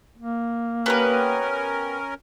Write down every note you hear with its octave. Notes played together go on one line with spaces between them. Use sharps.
A#3
B3 C#4 G4 A#4 B4